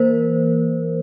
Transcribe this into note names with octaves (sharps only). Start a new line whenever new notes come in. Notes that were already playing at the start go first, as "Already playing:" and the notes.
Already playing: E3 A#3 A#4 C5